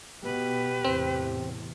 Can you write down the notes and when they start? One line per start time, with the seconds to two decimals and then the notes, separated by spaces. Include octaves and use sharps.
0.24 B2 G4 B4
0.85 E2 A2 C3 C4